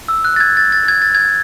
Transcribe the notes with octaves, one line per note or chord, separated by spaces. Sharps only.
E6
F#6
A6
G#6
A6
A6
G#6
A6
G#6